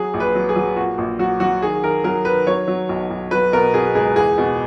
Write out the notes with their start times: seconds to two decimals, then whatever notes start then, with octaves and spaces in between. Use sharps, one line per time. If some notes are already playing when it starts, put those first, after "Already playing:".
Already playing: F#3 G#4
0.14 A#1
0.20 B4
0.35 F#3
0.49 G#4
0.56 F#3
0.76 A#2 F#4
0.98 A#1
1.19 F#3 F#4
1.40 F#3 F#4
1.62 D#3 G#4
1.83 D#3 A#4
2.04 F#3 A#4
2.25 D#3 B4
2.47 F#3 C#5
2.68 F#3
2.89 B1
3.11 B1
3.31 F#3 B4
3.52 B2 A#4
3.74 B2 G#4
3.95 C#2 G#4
4.16 E2 G#4
4.38 B2